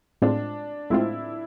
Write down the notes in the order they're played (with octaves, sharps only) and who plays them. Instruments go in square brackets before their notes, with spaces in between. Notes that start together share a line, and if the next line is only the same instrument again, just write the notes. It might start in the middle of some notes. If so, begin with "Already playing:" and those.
[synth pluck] A2 G#3 C4 F4 [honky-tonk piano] D4
[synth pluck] A2 G#3 C4 F4 [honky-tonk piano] E4